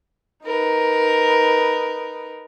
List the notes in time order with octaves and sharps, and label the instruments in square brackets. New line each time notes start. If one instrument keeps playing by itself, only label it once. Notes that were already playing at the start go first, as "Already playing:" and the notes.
[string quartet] D#4 A#4 B4